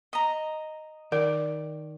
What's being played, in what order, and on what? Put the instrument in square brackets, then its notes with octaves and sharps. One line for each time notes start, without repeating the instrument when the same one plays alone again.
[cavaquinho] D#5 A#5
[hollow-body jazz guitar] D#3 D5 [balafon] A#4